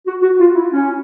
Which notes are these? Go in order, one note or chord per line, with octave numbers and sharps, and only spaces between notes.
F#4
F#4
F4
E4
C#4